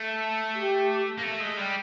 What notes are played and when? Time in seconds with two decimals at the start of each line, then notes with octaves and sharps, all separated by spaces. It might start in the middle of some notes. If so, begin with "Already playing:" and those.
Already playing: A3
0.55 G4
1.18 A#3
1.23 A3
1.40 G#3
1.57 G3